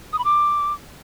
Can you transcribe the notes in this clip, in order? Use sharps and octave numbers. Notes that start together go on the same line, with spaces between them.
D#6
B5
D6